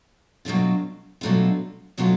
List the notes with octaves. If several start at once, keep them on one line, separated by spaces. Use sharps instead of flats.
B2 F#3 A3 D4 F4
B2 F#3 A3 D4 F4
B2 F#3 A3 D4 F4